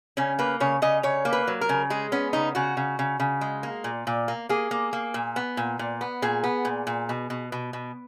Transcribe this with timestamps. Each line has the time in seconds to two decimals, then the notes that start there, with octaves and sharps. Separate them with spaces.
0.17 C#3 C#4
0.39 A#3 B4
0.60 C#3 C#5
0.82 C#3 D#5
1.03 C#3 C#5
1.25 A#3
1.33 B4
1.47 F#3
1.61 A#4
1.69 C#3
1.90 G#3 G#4
2.12 B3 C#4
2.33 C#3 D#4
2.55 C#3 F#4
2.77 C#3
2.99 C#3
3.20 C#3
3.41 G#3
3.63 A#3
3.84 A#2
4.07 A#2
4.28 A#3
4.49 A#3 G#4
4.71 A#3
4.93 A#3
5.14 A#2
5.36 B3
5.57 A#2
5.79 A#2
6.01 B3
6.22 A#2 G#4
6.44 B3
6.65 A#2
6.87 A#2
7.09 B2
7.30 B2
7.52 B2
7.73 B2